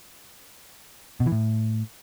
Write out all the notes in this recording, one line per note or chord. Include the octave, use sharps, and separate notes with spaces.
B2
E3
A2